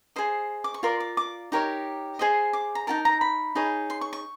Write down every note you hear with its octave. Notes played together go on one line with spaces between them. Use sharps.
G#4 C5 D#5
D6
C#6
F4 A#4 D5 C6
D6
D6
D#4 G4 A#4 C#5
G#4 C5 D#5
D6
A#5
D#4 F#4 A#4 A5
A#5
B5
D#4 G#4 C#5
C6
C#6
C#6